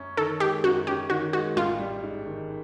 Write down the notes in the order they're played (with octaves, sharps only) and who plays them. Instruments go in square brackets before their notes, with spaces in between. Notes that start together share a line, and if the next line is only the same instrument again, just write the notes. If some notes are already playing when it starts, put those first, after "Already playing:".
Already playing: [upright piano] F#2 C#4
[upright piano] D#3 [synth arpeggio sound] A4
[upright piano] G#3 [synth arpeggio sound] G4
[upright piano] F#2 [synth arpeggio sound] F#4
[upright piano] C#4 [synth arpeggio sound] G4
[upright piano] D#3 [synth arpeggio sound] F#4
[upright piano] G#3 [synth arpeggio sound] F#4
[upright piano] A1 [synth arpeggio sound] F4
[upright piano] G3
G#2
D#3